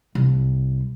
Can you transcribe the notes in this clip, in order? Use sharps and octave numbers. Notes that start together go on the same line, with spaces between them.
C2